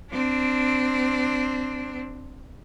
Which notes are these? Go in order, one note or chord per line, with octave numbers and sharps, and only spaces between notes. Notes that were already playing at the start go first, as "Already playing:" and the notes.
C4 D4